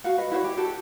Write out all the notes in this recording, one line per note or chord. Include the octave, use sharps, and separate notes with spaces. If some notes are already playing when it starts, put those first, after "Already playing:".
F#4 F5 F#5
B4 D#5
E4 F#4 C5 C#5
G4
F#4 G4 A4